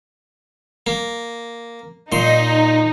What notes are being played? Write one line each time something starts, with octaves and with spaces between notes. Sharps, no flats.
A#3
A#2 D#4 C6